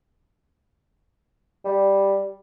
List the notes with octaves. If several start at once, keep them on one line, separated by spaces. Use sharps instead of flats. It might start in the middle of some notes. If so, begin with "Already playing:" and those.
G3